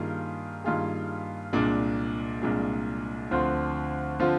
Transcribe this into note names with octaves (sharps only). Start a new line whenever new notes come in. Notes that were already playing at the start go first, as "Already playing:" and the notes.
Already playing: G2 D#3 A#3 F4 G#4
G2 D#3 A#3 F4 G#4
C2 A#2 G#3 D4
C2 A#2 G#3 D4
D2 D3 F3 C4 F4
D3 F3 C4 F4